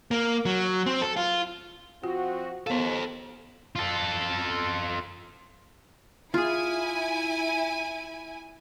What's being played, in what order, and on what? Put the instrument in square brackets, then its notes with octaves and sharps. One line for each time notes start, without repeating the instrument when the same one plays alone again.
[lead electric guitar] A#3
F#3
C4
A4
F4
[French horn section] F3 C4 F#4 [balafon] F4
[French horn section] D#2 [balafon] B3 F5 [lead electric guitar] A4 C5
[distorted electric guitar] F4 A4
[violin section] E4 G#5 [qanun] F4 G#4